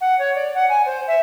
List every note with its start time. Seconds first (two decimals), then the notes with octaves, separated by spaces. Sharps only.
0.01 F#5
0.18 C#5
0.35 D5
0.55 F#5
0.69 G#5
0.86 C5
1.07 E5